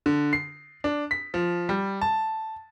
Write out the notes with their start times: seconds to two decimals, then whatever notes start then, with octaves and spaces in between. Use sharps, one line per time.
0.06 D3
0.33 C7
0.84 D4
1.11 B6
1.34 F3
1.69 G3
2.02 A5